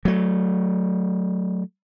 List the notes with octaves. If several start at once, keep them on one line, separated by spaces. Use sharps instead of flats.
F#3 A3